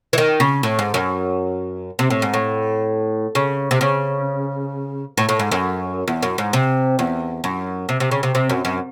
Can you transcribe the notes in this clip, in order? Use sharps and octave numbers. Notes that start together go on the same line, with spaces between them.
E3
D#3
C#3
A2
G#2
F#2
C3
A2
G#2
A2
C#3
C3
C#3
A2
A2
G#2
F#2
E2
F#2
G#2
C3
E2
F#2
C3
C3
C#3
C3
C3
F#2
F#2